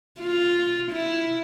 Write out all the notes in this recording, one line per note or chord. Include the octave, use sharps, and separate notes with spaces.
F4
E4